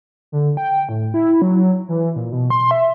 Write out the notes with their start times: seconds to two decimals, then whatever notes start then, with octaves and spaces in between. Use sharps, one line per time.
0.32 D3
0.57 G5
0.89 A2
1.14 E4
1.42 F#3
1.89 E3
2.16 A#2
2.32 B2
2.50 C6
2.71 E5